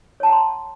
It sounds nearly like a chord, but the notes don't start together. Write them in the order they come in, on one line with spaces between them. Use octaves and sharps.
C#5 A5 F#5 A#5 C6